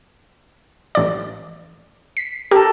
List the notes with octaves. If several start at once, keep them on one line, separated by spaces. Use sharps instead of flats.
A1 D5
B6 C7
G4 A4 A#4